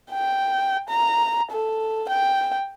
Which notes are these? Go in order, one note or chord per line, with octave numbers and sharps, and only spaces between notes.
G5
A#5
A4
G5